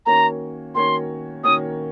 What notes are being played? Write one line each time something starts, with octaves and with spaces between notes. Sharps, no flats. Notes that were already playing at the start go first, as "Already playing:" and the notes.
D#3 A#3 C#4 F#4 C#5 A#5
D#3 A#3 C#4 F#4 C#5 C6
D#3 A#3 C#4 F#4 C#5 D#6